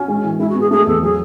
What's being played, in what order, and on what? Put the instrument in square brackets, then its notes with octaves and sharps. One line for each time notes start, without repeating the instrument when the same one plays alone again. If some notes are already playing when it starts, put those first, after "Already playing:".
Already playing: [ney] C#4 [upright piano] F#4
[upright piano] G#3
E3
[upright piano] G#3 [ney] E4
[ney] F#4
[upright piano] B3
[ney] G#4
[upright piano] A3 [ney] G#4
[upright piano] E2 [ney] A4
[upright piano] F#3 [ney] G#4